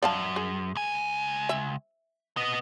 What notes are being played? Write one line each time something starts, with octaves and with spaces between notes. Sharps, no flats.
F#2 D5 F5 A5
G#4
C#2 G#5
E5
B3 D#5